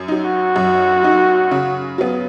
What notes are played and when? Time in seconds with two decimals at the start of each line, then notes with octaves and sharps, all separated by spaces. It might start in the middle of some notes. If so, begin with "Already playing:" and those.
Already playing: F#2
0.08 F#3 D#4
0.25 F#4
0.56 F#2
1.03 F#3 D#4
1.51 C#3
1.98 F#3 B3